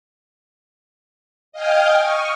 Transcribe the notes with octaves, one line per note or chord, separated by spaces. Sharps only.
D#5 F5 G5 G#5 F6
C#6 D#6 F6